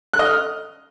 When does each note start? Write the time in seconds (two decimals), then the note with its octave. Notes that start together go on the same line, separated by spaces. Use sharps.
0.13 F#6
0.19 D#5
0.25 F6